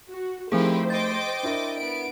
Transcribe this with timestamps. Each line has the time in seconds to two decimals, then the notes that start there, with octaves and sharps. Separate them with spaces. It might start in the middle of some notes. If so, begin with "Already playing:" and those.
0.10 F#4
0.52 F3 A3 C4 D#4 E4 G4 G#4 C5
0.90 D#5 G5 D6 A6
1.43 D4 E4 A#4
1.78 B3 D7